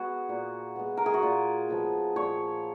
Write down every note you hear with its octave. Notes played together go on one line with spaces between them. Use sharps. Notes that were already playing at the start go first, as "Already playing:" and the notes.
Already playing: G#3 B3 F#4 G#4
A#2
G#3 B3
A#4
G#4
F#4
A#2 F4
F3 G#3 B3
A#2 C#5